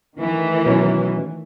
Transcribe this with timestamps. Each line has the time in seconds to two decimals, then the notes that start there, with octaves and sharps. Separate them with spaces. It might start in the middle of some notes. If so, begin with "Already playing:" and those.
0.16 D#3 E3 A3
0.66 B2 F#3 C#4